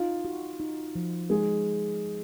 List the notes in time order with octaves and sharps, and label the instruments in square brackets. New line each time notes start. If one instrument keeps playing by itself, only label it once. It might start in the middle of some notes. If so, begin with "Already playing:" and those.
Already playing: [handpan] D#4 [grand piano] F4
[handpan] F#4
D#4
F3
[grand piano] G#3 G#4 [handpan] D#4